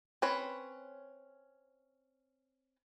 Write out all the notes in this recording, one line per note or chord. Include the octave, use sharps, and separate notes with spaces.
C4 C#4 B4 C#5